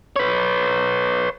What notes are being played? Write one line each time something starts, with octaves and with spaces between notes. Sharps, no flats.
B4 C#5